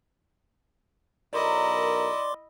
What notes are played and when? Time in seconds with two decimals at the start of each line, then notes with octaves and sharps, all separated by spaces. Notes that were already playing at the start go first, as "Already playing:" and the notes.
1.33 B1 E4 A#4 D5 D#5 C6 D6